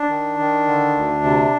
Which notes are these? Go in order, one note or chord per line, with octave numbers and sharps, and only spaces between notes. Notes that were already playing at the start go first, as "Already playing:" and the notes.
Already playing: D4
D#3
D#3
D3
D2
C3